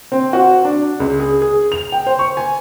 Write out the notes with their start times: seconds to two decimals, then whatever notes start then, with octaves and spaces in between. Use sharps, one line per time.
0.12 C4
0.33 F#4
0.65 D4
1.00 C#2
1.20 G#4
1.42 G#4
1.72 F7
1.92 G5
2.07 C5
2.19 C#6
2.37 G#5